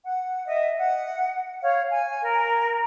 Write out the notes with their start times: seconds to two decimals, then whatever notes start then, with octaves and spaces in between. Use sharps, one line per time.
0.05 F#5
0.47 D#5 E5
0.78 F#5
1.62 C#5 F5
1.90 G#5
2.22 A#4